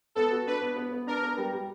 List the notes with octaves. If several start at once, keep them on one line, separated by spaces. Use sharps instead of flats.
B3 A4
F#4
D4 B4
B3
B3
B3
D4 A#4
B3
G3
G3